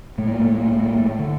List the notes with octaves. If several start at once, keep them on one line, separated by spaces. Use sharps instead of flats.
A2 A3
A#3
A3
A#3
A3
A#3
A3
D3